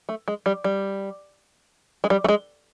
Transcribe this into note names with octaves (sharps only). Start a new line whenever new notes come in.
A3
G#3
G3
G3
G#3
G3
A3
G#3